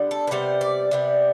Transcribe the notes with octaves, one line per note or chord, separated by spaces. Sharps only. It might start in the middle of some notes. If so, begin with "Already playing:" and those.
Already playing: D3 G3 B3
A4
B4
C3 G3 B3 C5
D5
C3 G3 B3